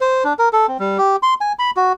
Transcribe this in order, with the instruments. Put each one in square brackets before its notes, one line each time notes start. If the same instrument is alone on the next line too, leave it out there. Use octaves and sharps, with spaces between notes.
[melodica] C5
D4
A#4
A4
C4
G3
G4
C6
G#5
B5
F#4